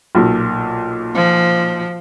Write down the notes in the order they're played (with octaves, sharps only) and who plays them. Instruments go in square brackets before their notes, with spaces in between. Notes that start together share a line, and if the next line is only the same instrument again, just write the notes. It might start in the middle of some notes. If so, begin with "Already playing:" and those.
[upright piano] B1 A#2
[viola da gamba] F3